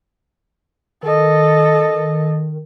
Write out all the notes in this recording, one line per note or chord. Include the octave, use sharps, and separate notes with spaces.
D#3 A4 D#5